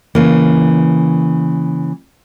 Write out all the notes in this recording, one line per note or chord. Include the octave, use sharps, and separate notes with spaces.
C#3 E3 A#3